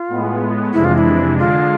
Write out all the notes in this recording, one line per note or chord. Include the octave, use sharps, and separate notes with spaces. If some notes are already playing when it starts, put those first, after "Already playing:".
Already playing: F4
A2 G#3 B3
F2 C3 E3 G#3 D4 E4
F4
F4
E4
D3 G#3 D4 F4